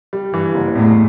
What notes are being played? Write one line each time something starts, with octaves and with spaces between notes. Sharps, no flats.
G3
G2 E3
F#1
E2 A2